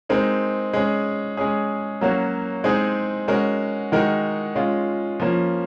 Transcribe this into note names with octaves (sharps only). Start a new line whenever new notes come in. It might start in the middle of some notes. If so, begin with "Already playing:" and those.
G#3 C4 D#4 A#4
G#3 C#4 G#4
G#3 C#4 G#4
F#3 A#3 C#4 F#4
G#3 C4 D#4 G#4
G#3 C#4 F#4 A#4
D#3 G#3 D#4 F#4 A#4
G#3 C#4 F4
F3 A#3 C#4